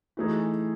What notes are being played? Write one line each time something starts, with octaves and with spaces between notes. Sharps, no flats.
E3 A3 D#4 G#4